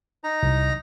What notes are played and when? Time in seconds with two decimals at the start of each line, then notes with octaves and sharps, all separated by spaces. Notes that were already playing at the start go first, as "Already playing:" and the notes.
0.24 D#4 A#5
0.43 C2